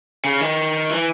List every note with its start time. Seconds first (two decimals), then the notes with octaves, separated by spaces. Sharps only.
0.24 C#3
0.41 D#3
0.91 E3